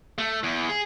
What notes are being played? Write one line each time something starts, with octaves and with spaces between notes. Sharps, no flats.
A3
E2
G#4